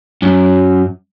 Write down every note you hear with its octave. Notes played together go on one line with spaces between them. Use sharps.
F#2